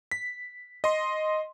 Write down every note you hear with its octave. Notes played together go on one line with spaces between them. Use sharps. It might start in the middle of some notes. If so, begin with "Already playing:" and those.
B6
D#5 C6